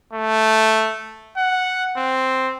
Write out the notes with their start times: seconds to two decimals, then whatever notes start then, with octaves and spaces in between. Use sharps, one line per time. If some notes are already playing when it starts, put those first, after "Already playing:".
0.13 A3
1.37 F#5
1.97 C4